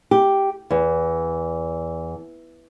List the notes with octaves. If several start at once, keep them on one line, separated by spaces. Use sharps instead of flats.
G4
E2